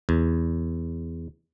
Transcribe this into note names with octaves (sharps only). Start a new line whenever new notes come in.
E2